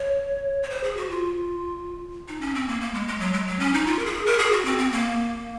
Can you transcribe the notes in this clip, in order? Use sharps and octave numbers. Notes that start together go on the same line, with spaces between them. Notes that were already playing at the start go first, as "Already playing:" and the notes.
Already playing: C#5
C#5
C5
G#4
F#4
F4
D#4
C#4
C4
A#3
A#3
G#3
G#3
F#3
G#3
F#3
C#4
D#4
F4
A#4
G#4
A#4
G#4
F#4
C4
C4
A#3